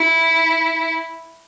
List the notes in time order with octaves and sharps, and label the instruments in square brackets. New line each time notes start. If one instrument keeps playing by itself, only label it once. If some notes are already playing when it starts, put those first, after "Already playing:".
Already playing: [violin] E4